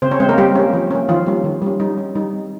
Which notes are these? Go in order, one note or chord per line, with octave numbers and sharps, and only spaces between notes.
C#3 C4 C5
C#4 C#5
G#3 C4 C5
A#3 A#4
G3 G4
A#3 C#4
F3
A#3 C#4
D#3 F3 F4
G3 A#3 C#4
D#3
G3 C#4
G3 D#4
C#4
G3 D#4
C4